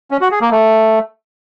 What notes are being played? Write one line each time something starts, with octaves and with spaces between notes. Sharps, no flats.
C#4
F#4
G#4
A#3
A3